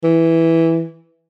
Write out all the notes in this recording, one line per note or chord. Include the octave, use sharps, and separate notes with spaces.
E3